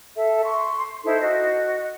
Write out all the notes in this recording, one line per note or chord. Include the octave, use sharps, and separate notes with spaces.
A4 E5
C6 C#6
D#4 E4 A4 C5
F#4 D#5